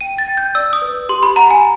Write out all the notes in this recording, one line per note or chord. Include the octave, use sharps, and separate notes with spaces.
G5 D#7
A6
G5
G6
D5 E6
D#6
B4
G4 C6
B5
F#5 A#5
G#5